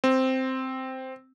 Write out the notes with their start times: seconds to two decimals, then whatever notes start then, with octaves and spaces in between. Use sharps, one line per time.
0.04 C4